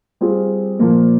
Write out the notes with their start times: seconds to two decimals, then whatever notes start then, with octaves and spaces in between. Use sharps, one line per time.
0.21 G3 C4 F4 G#4
0.79 A#2 F3 A#3